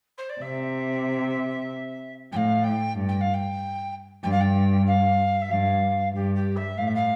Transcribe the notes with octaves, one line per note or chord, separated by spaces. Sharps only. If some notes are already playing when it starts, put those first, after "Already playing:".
C5
D5
C3 E5
A2 F5 G5
G5
G2
G5
F5
G5
G2 G5
F5
G5
F5
E5
G2 F5
G2 G4
G4
E5
A2 F5
E5
F5